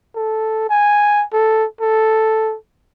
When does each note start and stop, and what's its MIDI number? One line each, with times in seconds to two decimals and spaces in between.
0.16 0.66 69
0.70 1.24 80
1.33 1.66 69
1.81 2.56 69